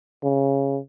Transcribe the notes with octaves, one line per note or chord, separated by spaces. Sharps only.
C#3